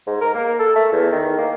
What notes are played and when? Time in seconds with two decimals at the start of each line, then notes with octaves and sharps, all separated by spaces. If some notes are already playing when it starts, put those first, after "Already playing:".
0.07 G#2
0.21 A#4
0.34 A#3
0.60 A4
0.76 A3
0.92 E2
1.12 D#3
1.38 A#3